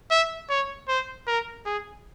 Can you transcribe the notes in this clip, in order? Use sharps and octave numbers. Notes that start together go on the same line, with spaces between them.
E5
C#5
C5
A#4
G#4